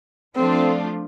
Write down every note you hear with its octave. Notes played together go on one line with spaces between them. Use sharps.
F3 A3 C4 D4 F4